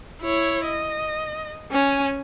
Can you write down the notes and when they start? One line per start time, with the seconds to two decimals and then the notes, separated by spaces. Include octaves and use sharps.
0.22 E4 C#5
0.65 D#5
1.72 C#4 G#5